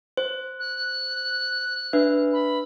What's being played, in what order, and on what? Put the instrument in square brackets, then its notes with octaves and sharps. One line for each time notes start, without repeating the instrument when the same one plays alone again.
[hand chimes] C5
[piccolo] F#6
[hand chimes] D4 B4 E5
[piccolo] B5